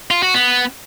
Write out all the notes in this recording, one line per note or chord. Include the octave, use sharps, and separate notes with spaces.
F4
F#4
B3